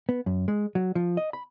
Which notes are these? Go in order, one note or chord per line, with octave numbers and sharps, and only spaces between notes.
B3
F#2
G#3
F#3
F3
D#5
B5